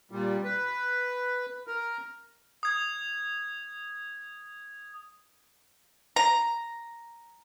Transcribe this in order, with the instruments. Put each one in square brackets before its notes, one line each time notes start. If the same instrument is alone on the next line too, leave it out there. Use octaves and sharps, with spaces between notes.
[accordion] A#2 G3
B4
A#4
[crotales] D#6 G#6
[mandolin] A#5